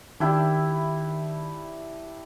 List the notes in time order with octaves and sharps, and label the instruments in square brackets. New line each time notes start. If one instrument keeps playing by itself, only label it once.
[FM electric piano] D#3 [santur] D4 E4 G4